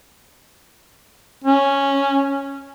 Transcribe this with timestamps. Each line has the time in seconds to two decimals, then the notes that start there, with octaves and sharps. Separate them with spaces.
1.44 C#4